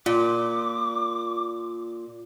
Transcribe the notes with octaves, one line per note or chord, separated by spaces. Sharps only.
A#2 F4 D6